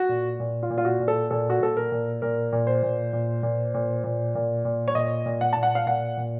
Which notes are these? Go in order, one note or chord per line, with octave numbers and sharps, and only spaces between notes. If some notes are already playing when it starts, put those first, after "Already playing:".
Already playing: F#4
A#2
A#2
F4
A#2
F4
F#4
A#2
A4
A#2 A4
F#4
A#2 A4
A#4
A#2
A#2 A#4
A#2
C5
A#2
A#2
A#2
A#2
A#2
A#2
A#2
C#5
A#2 D#5
A#2
F#5
A#2 A5
F#5
F5
A#2 F#5
A#2